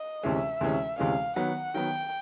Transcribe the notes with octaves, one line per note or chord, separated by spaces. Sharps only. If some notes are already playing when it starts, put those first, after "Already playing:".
Already playing: D#5
D2 C3 E3 G#3 C#4 E5
D2 C3 E3 G#3 C#4
D2 C3 E3 G#3 C#4 F5
D#3 F#3 B3 F#5
D#3 F#3 B3 G5